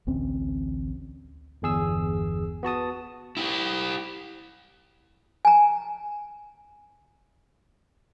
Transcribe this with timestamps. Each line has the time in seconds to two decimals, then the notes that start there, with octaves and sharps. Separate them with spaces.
0.07 A1 D2 C4 C#4
1.62 G1 E2 G#4 E6
2.63 B3 F#4 A5 D#6
3.37 E4 G4
5.45 G#5 A#5